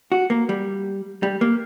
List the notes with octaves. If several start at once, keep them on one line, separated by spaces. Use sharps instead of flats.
F#4
A#3
G3
G3
A#3